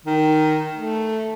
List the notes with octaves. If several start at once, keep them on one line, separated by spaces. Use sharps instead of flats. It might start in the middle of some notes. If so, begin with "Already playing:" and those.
D#3
A3